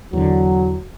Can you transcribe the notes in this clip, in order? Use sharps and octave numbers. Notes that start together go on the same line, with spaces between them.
E2 D3 F#3